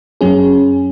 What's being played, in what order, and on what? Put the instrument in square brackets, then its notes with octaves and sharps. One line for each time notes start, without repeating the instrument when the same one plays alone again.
[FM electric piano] F#2 F#3 C#4 G#4